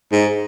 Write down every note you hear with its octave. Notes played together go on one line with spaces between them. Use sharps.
G#2